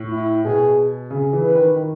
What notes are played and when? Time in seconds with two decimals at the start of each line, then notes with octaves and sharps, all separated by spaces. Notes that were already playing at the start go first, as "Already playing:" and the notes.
Already playing: A2
0.12 E4
0.45 B2 G#4
1.10 C#3 G#4
1.33 E3
1.44 B4
1.55 D#3
1.76 D#3